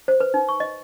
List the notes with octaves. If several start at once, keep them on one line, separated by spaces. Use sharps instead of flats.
C5
B4
D#4
C#6
D#5